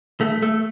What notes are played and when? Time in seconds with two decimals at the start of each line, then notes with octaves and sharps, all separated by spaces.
0.21 A3
0.42 A3